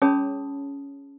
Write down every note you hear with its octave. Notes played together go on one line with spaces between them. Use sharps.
C#4 G#4 C#5 A5 B5 D#6